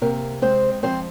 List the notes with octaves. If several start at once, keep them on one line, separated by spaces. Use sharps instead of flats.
C3 A#3 A#4
G#3 C4 C5
F3 C4 C5